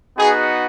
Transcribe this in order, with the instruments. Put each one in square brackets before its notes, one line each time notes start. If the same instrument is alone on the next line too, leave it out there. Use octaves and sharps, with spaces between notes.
[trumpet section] B3 D#4 F#4 G#4